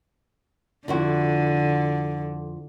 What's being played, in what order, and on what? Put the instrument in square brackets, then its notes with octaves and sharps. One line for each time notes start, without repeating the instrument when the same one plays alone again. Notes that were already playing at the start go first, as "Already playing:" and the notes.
[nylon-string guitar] F2 E4 F#4 [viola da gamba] D3